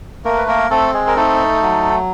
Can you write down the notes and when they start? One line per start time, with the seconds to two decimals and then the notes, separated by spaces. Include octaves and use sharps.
0.25 A3 A#3 A#4
0.38 B4
0.48 A#3 A#4
0.70 A3 C4 A4
0.94 G#3 G#4
1.07 A#4
1.16 A3 D#4 A4
1.62 F#3